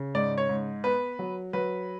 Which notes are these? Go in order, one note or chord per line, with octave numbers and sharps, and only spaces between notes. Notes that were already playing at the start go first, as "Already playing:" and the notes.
Already playing: C#3
G#2 D5
C#5
G#2
B3 B4
F#3
F#3 B4